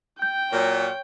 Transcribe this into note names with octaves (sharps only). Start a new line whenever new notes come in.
G5 G6
A#2 F#3 C#5